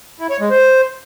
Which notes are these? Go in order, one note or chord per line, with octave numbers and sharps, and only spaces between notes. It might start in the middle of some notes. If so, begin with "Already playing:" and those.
E4
C#5
G#3
C5